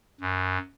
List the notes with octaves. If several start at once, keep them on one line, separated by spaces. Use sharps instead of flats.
F#2